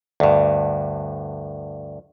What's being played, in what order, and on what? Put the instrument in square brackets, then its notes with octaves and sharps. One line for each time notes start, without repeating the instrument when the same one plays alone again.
[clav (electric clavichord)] D2 G2